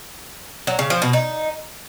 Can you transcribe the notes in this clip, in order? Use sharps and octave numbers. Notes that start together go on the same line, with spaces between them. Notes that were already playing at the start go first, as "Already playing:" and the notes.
F#3
C#3
F3
B2
D#4